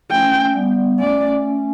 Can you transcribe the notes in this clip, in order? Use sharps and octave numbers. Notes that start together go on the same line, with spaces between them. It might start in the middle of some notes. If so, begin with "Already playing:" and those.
A3 C#4 G5
G3 B3
A3 C#4 D5